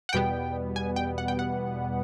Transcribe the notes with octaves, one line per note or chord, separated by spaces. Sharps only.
F#5
E2 B2 G3 B3 G5
G#5
G5
F#5
G5
F#5